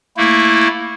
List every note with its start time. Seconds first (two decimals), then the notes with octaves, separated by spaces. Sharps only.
0.17 A3 A#3 E4